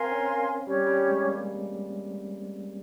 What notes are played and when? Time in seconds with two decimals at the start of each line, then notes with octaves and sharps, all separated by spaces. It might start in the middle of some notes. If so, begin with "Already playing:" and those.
Already playing: C4 A#4 F5 G#5 C6
0.12 C#4
0.66 G3 C#4 G4 C#5
0.86 G3
1.08 G#3
1.28 A#3